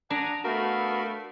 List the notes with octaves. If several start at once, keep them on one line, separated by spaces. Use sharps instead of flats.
D4 F#5 G#5 A#5 D#6
A3 B3 F#4 A#4 F5 B5